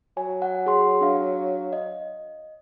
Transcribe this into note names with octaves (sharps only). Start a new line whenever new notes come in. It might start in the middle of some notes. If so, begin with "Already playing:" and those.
F#3 G#5
F#5
G#4 C6
D4 F5
D#5